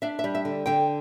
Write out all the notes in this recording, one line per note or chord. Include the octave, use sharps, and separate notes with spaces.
D4 E5
E5
G3
E5
D3
D3 G5